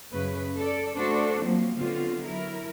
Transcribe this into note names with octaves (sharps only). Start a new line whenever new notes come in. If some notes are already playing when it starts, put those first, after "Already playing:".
F#2 C#3 B4
A4 D5
A3 D4 F#4 A4 C5
F3 F#3 A#3 C4
D3 F#3 B3 C4 F4
F#3 E4 A#4